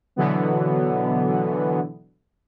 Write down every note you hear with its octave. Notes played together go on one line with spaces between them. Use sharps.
B2 D3 E3 F#3 B3